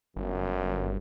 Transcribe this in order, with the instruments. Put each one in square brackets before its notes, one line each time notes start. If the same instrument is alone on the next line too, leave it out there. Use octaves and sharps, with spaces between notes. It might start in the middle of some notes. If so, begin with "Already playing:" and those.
[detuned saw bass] G1 [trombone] F#2